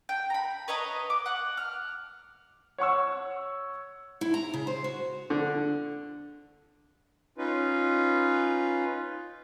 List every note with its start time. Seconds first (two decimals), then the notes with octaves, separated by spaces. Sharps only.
0.09 G5
0.30 A#5 B5
0.68 B4 C#5 D#5 A#5
1.10 D6
1.26 F#5
1.57 F6
2.78 C#5 F#5 C#6 E6
4.21 E4
4.34 A#5
4.54 C#3
4.67 C5
4.84 F#4
5.30 D3
7.38 C#4 D#4 F4 B4